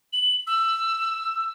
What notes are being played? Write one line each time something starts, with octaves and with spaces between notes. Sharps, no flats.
F#7
E6